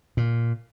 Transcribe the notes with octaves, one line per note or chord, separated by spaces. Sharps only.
A#2